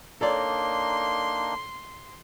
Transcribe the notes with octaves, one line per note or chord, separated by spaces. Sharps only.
A#3 D4 D#4 A4 C#5 D5 C6